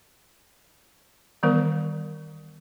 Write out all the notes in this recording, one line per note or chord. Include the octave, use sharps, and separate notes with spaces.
D#3 E3 G3 B3 A#4